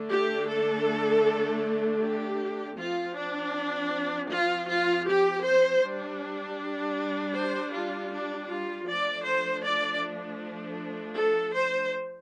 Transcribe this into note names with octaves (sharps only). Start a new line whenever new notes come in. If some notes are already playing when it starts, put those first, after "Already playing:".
Already playing: D3 A3 D4
G4
A4
G4
F3 C4 F4
D4
F4
F4
G4
C5
G3 D4
C5
F4
D4
F4
F3 A3 D4 D5
C5
D5
A4
C5